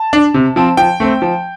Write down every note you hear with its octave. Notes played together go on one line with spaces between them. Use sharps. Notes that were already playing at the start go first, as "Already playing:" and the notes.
Already playing: A5
D4
C3
F3 C4
F3 G5
A3 C4
F3